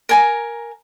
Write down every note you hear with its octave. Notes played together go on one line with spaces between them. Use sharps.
A#4 G#5 A#5